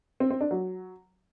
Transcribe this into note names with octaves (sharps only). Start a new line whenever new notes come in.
C4
C4
D4
F#3